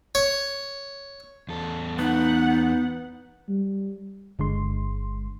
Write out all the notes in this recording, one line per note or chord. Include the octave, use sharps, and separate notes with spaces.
C#5
E2 A4
B3 D#4 F#5
G3
G1 D3 G#3 C6